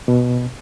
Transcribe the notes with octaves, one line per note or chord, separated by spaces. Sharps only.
B2